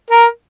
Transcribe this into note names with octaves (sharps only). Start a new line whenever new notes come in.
A#4